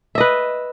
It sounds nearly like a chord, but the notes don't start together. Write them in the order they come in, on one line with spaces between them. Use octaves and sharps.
E5 D#5 B4